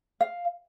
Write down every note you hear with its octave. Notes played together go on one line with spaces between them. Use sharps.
F5